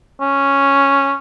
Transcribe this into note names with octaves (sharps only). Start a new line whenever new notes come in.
C#4